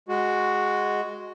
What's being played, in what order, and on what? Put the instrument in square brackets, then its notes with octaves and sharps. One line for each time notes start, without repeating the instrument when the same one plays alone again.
[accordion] G#3 F#4